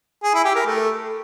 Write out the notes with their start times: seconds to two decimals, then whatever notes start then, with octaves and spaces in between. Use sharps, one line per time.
0.23 G#4
0.34 E4
0.45 G4
0.55 A#4
0.66 A3